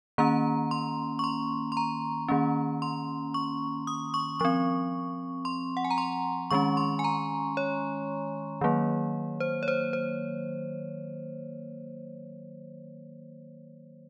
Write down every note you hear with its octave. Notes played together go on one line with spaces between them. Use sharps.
D#3 A#3 C#4 A#5
C6
C#6
C6
C6
A#5
D#3 A#3 C#4
C6
C#6
D#6
C#6
F3 C4 C#6
C6
F#5
G#5
A#5
C6
D#3 G#3 C#4 C#6
C6
G#5
A#5
C#5
D#3 F#3 A#3
C5
C#5
C5
C5